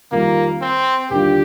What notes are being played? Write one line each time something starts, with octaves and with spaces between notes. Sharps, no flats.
F2 D#3 G3 A#3
C4
D#2 D3 G3 D4 F4 G4